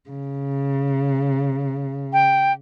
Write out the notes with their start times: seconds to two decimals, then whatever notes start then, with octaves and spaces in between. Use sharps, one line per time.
0.10 C#3
2.13 G5